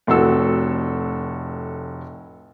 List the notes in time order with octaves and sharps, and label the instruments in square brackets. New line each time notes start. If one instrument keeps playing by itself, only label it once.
[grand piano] F1 A2 F#4 A4 E6